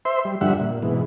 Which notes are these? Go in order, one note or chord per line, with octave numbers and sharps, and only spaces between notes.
C5 E5 C6
G3
G2 D3 F3 G3 E5 F#5
A#2
G#2 B2 E3